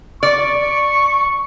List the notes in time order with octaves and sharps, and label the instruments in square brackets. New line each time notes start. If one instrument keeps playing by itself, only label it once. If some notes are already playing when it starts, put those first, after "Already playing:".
[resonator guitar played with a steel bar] D5 [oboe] C#6